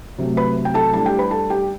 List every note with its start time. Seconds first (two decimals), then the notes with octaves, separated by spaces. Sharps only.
0.18 C3 F#3 A3
0.37 B4 B5
0.65 G5
0.74 A4 A5
0.93 A2 G3 D4 A4 A5
1.06 G4 G5
1.18 B4 B5
1.31 A4 A5
1.50 G4 G5